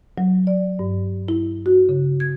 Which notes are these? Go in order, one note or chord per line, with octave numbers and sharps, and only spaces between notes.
F#3
D5
G2
E4
F#4
C#3
G#6